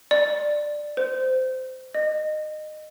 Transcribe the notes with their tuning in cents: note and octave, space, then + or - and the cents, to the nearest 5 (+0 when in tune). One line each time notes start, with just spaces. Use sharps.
D5 +10
C5 -20
D#5 -20